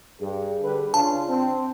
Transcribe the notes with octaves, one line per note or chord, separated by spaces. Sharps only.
G2 G#4
D3 G3 B4
C#3 D4 F4 A5
C4